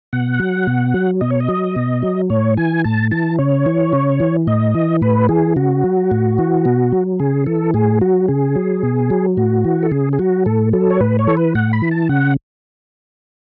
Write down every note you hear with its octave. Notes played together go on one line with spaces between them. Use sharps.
B2 F#5
F#3
B2
F#3
B2 D#5
C#5
D#5
F#3
B2
F#3
A2 C#5
E3 G#5
A2 A5
E3 A5
C#3 C#5
E3
C#3
E3
A2 D#5
E3
A2 B4
E3 G#4
C#3 F#4
F#3
A2
E3
B2
F#3
C#3 G#4
E3 A4
A2 G#4
F#3 F#4
C#3 G#4
F#3
B2
F#3
A2 F#4
E3
A4
C#3 G#4
G#4
F#3 F#4
A2 A4
F#3 A4
C#5
A2 B4
C#5
E3 A4
B4
A2 F#5
B5
E3
A5
C#3 F#5